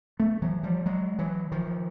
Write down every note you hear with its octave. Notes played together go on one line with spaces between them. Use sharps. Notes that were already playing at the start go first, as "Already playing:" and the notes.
A3 B3
E3 F#3
F3 G3
F#3 G#3
E3 F#3
D#3 F3